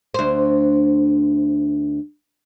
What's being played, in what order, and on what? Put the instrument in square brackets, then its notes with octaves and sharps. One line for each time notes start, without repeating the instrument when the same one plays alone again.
[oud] D2 C5